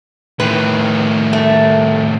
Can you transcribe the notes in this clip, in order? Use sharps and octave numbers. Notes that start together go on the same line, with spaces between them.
A2 D#3 B4
A3